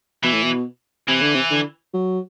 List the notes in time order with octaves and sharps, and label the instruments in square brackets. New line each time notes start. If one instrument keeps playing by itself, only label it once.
[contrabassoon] B2 [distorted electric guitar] E3
[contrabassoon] A2
B2
[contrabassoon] C3 [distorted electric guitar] E3
[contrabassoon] D3
C3
D3
F#3